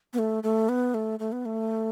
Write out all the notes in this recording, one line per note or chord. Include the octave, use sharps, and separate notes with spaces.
B3
A3
A3
B3
A3
A3
B3
A3